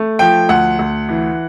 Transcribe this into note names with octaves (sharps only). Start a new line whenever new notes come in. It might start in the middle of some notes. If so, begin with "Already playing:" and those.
Already playing: A3
F3 G5
D2 F#5
D2
E3